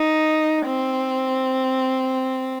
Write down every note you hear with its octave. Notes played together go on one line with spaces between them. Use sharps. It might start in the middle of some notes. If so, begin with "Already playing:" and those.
Already playing: D#4
C4